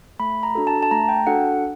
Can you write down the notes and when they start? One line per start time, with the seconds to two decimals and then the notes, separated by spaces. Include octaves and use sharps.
0.20 A3 B5
0.43 A#5
0.55 D4 F#4 A4
0.67 A5
0.83 A5
0.91 A3 A#5
1.09 G5
1.27 D4 F#4 A4 F#5